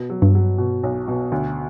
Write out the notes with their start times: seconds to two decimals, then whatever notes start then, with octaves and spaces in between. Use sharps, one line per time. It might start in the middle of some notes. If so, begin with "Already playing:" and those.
Already playing: B2
0.10 F#3
0.22 G2
0.35 F#3
0.58 B2
0.83 B1
1.08 B2
1.32 D2